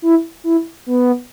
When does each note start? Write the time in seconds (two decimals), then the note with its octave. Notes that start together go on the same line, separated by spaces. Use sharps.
0.02 E4
0.44 E4
0.86 B3